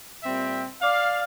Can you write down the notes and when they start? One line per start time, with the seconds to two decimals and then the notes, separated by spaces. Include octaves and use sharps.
0.24 A#2 G3 C4 E5 G5
0.82 D5 F5